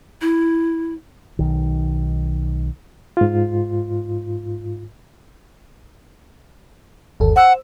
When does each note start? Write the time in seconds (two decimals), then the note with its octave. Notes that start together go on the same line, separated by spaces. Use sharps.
0.21 E4
1.39 B1 D#3
3.17 G#2 F4
7.20 G1 D#2 A4
7.36 C5 F#5 E6